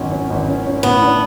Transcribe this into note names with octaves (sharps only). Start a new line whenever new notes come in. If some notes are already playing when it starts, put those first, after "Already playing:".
Already playing: G#1 F#3 C#4
C#4
G#1
C#4
C#4
A2 B3
D4